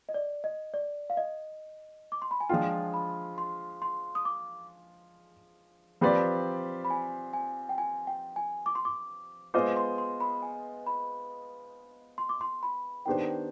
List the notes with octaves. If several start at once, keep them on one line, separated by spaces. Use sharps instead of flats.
D#5
D5
D#5
D5
F5
D#5
D6
C6
B5
G#5
F3 G#3 D4 F4 G5
B5
C6
C6
D#6
D6
F3 C4 G4 B4 D5 B5
B5
G#5
G#5
G5
G#5
G5
G#5
D6
C6
D6
G#3 B3 F4 C5 D#5 D6
C6
C6
B5
G#5
B5
C6
D6
C6
B5
D#3 B3 D4 G4 C5 G5